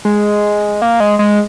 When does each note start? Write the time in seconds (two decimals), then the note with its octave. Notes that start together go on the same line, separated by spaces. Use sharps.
0.05 G#3
0.82 A#3
1.00 G#3
1.19 G#3